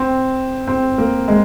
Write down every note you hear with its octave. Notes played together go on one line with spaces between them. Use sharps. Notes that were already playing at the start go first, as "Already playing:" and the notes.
Already playing: C4
C4
A#3
G#3